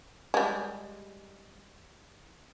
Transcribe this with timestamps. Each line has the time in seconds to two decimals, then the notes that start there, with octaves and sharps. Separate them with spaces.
0.34 G3 G#3